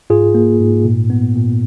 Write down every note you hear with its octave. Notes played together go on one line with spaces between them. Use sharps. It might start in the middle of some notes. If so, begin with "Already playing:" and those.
G#2 F4 G#4
A#3
G#2
A#2
B3
A#2